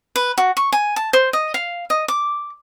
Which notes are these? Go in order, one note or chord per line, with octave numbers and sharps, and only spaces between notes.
B4
F#4
C#6
G#5
A5
C5
D#5
F5
D#5
D6